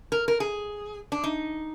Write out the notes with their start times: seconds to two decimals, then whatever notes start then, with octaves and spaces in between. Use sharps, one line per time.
0.12 A#4
0.28 A#4
0.40 G#4
1.12 D4
1.24 D#4